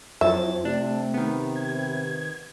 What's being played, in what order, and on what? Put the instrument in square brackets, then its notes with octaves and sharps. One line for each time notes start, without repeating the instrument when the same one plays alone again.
[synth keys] F2 F#3 A6 [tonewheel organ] E4 F4 C5 [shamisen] E5
[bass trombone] C3 [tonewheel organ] A3 [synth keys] D4
[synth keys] D#3 B3
[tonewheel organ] G#6